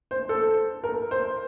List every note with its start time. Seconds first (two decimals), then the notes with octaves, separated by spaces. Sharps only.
0.11 C5
0.29 A4
0.84 A#4
1.11 C5